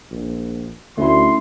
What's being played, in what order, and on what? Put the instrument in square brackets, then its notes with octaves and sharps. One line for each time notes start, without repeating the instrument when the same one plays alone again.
[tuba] A#1
[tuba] D2 [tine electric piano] A3 C#4 E4 [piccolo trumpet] C6